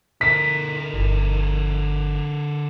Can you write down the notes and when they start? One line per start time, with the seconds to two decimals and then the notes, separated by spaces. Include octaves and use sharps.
0.21 D3 A#4 B6
0.94 G1